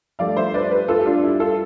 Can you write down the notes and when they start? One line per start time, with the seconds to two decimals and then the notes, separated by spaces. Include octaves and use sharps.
0.19 G2 F3 A3 D5 F5
0.37 C5 E5
0.54 B4 D5
0.71 G4 B4
0.88 F4 A4
1.00 G4
1.06 D4 F4
1.23 E4 G4
1.40 F4 A4